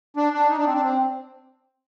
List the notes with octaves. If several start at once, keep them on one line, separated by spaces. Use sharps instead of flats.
D4
D4
D#4
D4
C4
D4
C4